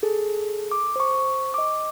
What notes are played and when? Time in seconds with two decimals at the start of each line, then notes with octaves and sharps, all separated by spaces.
0.03 G#4 A4
0.71 D6
0.96 C5 C#6
1.54 D#5 D6